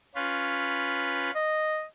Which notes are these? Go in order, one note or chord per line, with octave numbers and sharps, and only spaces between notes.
C#4 F4 B4
D#5